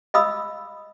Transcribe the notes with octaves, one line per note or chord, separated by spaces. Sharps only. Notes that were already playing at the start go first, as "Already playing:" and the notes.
D#5 F5 B5 D#6 E6